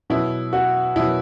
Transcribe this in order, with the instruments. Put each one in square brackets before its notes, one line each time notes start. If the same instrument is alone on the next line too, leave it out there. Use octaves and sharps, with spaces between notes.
[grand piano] B2 F#3 E4
F#4
B2 F#3 E4